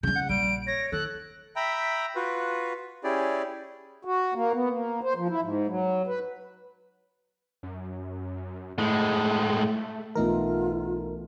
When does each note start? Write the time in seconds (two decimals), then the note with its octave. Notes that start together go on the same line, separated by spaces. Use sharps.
0.03 C#3 G#3 G6
0.16 F#5
0.29 A#1 G3 D7
0.67 C#5 A#6
0.92 D#3 A4 F#6
1.56 E5 G5 A#5 B5
2.16 F4 F#4 B4
3.04 C#4 E4 G4 G#4 D5
4.05 F#4
4.34 A#3
4.53 B3
4.70 A#3
5.03 C5
5.16 F3
5.29 E4
5.42 G#2
5.67 F#3
6.07 B4
7.63 F#2
8.78 A2 G#3 A3
10.15 B1 E3 A3 B3 D#4 F4 A#4